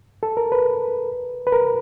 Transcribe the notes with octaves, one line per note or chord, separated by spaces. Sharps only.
A4
A#4
B4
B4
A#4